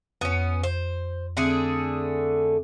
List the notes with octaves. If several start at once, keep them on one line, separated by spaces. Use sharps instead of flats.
F2 B3 C#4
C5
D3 A3 C4 G#4